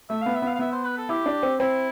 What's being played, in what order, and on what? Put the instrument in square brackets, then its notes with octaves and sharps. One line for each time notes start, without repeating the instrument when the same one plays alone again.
[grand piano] A3 [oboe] E5
[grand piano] B3 [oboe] F5
[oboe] E5
[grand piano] B3 [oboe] F5
[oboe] F5
[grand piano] B3 [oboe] E5
[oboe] C5
B4
A4
[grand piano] E4 [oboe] G4
[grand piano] D4
C4
[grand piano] C4 [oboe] E4